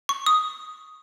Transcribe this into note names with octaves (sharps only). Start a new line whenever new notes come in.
C#6
D#6